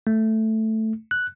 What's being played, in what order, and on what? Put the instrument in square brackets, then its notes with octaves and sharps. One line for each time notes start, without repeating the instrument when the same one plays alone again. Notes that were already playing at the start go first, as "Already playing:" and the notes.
[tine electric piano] A3
F#6